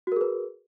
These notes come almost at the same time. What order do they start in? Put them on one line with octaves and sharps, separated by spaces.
F#4 A#4 G#4 B4